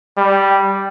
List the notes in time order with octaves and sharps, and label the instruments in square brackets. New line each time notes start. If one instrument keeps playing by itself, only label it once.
[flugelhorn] G3